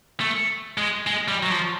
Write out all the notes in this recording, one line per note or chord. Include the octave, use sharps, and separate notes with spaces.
A3
G#3
G#3
G3
F#3
F3